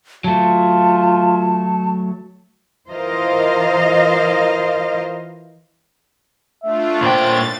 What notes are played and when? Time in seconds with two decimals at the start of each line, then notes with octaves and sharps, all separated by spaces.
0.24 F#3 A3 F4 A5
2.88 E3 F4 A#4 C5 D#5 F5
6.63 A3 D4 F4 E5
7.02 A#2 C5 G5 A6